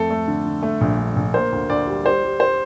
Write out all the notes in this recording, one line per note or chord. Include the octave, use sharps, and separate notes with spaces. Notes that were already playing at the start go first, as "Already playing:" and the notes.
Already playing: F2 A3 A4
A3
D3
D3
A3
A#1
A3
A#1
A#3 C5
D2
D2 D5
G3
G3 C5
G3
C5